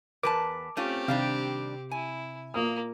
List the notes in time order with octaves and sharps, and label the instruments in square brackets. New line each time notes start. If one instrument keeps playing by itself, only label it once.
[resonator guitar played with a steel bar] E2 B4 A5 [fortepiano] A#4 [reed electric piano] D6
[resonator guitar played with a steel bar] A3 C#4 F4 [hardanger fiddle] C4 G4
[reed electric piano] C3 [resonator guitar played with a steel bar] D#3 G3 D4 [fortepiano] F5
[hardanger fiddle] E4 [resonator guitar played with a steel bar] G#5
[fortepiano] A#2 D#6 [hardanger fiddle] A#3